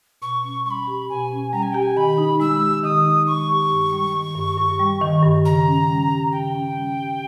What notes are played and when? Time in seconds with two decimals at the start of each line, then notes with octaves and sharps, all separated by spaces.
0.22 B2 C#6
0.44 C#4
0.66 G3 C#6
0.71 B5
0.87 G4
1.09 B2 G#5
1.32 C#4
1.52 G3 A#5
1.62 G#5
1.72 G4 G5
1.82 G#5
1.96 D#3 B5
2.18 D#4
2.40 G#3 E6
2.62 G4
2.83 D#3 D#6
3.05 D#4
3.27 G#3 C#6
3.49 G4
3.71 G2
3.93 G3
4.14 D#3
4.35 G2
4.57 G2
4.79 G3
5.01 D#3
5.23 G2
5.45 C#3 A#5
5.67 C#4
5.88 G3
6.11 G4
6.32 C#3 G5
6.55 C#4
6.75 G3
6.97 G4